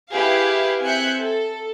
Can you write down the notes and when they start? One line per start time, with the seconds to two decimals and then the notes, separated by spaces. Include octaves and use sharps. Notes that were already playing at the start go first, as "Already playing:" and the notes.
0.11 E4 G4 G#4 B4 F5
0.83 C4 E5 G#5 F#6 G6 C#7
1.20 A4